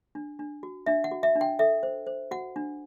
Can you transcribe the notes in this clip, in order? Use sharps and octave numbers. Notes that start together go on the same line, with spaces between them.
D4
D4
F#4
D4 E5
F#5
F#4
E5
D4
G5
A4 E5
C5
C5
F#4 F#5
D4